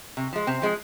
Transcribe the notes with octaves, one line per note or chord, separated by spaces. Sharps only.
C3
F3 G#3
C3 C4
F3 G#3